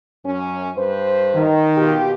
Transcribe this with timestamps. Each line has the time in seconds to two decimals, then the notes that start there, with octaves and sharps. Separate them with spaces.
0.24 F#2 C#4
0.75 G2 B4 C5
1.35 D#3
1.77 B2 F4 G4